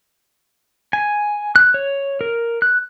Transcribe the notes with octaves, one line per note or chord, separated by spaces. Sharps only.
G#5
F#6
C#5
A#4
F#6